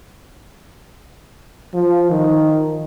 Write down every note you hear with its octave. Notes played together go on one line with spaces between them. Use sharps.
F3
D#3